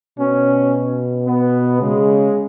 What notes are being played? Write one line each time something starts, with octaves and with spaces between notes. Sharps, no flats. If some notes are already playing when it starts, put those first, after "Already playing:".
B2 C#4
B3
C#3 G#3